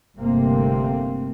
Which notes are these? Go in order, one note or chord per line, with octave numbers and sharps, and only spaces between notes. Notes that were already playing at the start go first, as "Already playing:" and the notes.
G1 C3 A3 A#3 C4